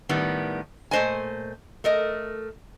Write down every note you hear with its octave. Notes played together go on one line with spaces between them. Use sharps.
A2 D#3 G3 B3
A#2 A3 C5 D#5 G#5
A3 A#4 D#5